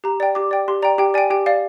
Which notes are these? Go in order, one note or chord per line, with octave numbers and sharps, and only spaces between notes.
G4 A#5
D5 G5
G4 D6
D5 G5
G4 C6
D5 G5 A#5
G4 G5
D5 G5 G#5
G4 G5
D5 F5